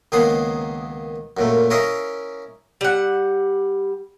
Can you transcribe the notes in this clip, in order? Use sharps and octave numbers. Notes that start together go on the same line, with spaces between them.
C#2 D#3 A#3 B3 G#4 C6
F#2 A#2 A3
C#4 E4 A#4 D#5 F5
G3 F#5